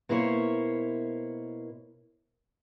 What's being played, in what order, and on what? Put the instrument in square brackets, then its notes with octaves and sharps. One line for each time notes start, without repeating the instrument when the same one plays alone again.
[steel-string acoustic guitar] B2 A#3 E4 C5 C#5